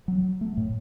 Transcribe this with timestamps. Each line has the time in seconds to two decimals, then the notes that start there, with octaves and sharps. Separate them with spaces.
0.08 F#3
0.41 A3
0.57 A2